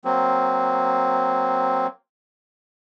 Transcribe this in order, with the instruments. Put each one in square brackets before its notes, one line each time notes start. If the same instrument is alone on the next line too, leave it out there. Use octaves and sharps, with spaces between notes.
[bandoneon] F#3 A#3 C4